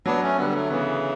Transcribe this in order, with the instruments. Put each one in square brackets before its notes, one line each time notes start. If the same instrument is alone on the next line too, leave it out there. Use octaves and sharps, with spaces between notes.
[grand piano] F#3 [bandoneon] B3 D4
[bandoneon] A3 C#4
[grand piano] D3 [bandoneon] G3 B3
[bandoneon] B3
F#3 A3
[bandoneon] C#3 E3 [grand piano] B3